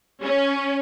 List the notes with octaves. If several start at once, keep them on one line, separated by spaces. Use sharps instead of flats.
C#4